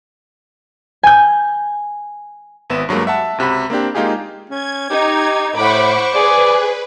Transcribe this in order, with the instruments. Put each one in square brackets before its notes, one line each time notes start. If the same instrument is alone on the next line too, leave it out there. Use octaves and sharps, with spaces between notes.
[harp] G#5 G6
[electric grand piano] G#1 B3 E5 E7
G2 F#3 G#3 A#3
E5 F#5 A5
C#2 C3 F#4 B5
A#3 C4 D4 G4
G#3 A#3 D#4 F4 G4 G#4
[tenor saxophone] C#4 [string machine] G#6
[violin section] D#4 [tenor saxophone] G4
[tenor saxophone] A2 [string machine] C5 C#6 [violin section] F#5 B5 D6
[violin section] G#4 [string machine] B4 [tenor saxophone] D5